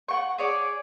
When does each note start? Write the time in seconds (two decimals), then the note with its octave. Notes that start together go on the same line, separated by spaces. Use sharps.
0.08 F#5 G5 C#6
0.38 G#4 C#5 D5